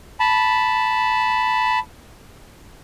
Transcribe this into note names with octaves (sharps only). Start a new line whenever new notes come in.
A5 B5